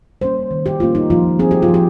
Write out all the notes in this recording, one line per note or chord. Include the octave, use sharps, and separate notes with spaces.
G3 A#3 C#4 C5
D#3
G4
G3 A#3 C#4 F4
D#4
F3 F4
C4 G#4
G4
F4
F3
G4